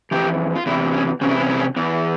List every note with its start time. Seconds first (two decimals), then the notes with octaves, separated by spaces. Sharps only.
0.11 F2 C3 E3 G4
0.56 F4
0.66 E2 C3 E3 E4
0.94 C#4
1.21 E2 C3 C#4
1.31 E4
1.40 C#4
1.50 E4
1.60 C#4
1.76 E2 E3